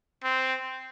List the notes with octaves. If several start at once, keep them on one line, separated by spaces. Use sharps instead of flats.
C4